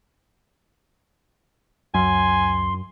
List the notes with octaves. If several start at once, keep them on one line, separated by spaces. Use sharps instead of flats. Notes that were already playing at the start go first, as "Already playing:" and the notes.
C#2 F#2 G#5 C6